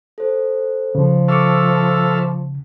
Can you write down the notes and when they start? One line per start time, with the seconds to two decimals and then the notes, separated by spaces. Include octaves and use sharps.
0.18 A4 C5
0.95 C#3 F3
1.28 A4 E5 F5 C#6 D6 C#7